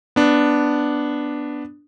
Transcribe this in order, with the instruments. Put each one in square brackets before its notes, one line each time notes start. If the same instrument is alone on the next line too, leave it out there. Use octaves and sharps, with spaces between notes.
[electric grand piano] B3 D4